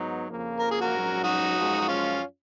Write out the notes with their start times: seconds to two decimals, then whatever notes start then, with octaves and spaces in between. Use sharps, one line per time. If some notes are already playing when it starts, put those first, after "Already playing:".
Already playing: G#2 F#3 B3 D#4
0.28 F2 C#3 F3 A#3
0.59 A#4
0.71 G#4
0.81 F#4 A#4
0.92 A#1 G#2 F#3 C#4
1.24 D#4 F#4
1.56 F#2 F3 G#3
1.81 F#4
1.88 C#4 F4